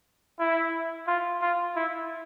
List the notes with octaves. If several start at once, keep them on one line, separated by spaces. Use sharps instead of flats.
E4
F4
F4
E4